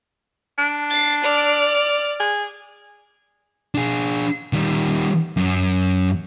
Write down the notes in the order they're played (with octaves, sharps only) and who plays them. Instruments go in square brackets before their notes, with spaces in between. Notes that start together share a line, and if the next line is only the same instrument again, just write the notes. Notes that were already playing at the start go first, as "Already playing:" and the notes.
[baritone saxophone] D4
[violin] A6 C7
D5 F6
[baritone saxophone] G#4
[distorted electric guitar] D4 G#4
D#3 G3
F#2